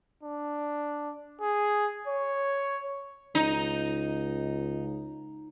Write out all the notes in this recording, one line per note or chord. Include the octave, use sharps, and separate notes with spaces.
D4
G#4
C#5
C#2 D#4